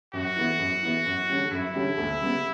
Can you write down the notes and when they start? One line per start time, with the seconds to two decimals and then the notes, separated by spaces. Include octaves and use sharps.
0.13 F#2 F#4
0.37 E3 B3
0.59 F#2
0.83 E3 B3
1.06 F#2
1.28 D3 G3 C#4 G4
1.51 F#2 E4
1.74 D3 G3 C#4 G4
1.98 D2
2.21 C#3 G3 B3